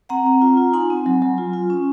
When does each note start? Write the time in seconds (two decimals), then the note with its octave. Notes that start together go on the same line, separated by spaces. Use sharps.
0.09 C4 F#5 A#5
0.26 C4
0.42 F4
0.57 F4
0.73 D#4 G#5 C6
0.90 C4
1.06 F#3
1.22 F#3
1.38 F4
1.53 F4
1.70 C#4